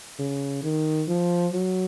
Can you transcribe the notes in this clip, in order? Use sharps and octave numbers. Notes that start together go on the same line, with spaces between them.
C#3
D#3
F3
F#3